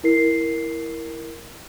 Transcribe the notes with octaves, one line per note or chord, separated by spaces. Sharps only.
E4 A#4 C7